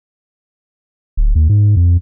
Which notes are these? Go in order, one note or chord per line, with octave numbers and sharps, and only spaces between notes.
D1
D#2
G#2
F2